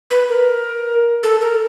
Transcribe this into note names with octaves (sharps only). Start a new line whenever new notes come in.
B4
A#4
A4
A#4